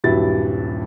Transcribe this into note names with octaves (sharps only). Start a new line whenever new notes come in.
D#1 G2 F#3 E4 A6